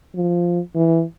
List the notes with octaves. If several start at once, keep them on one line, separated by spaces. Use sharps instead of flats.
F3
E3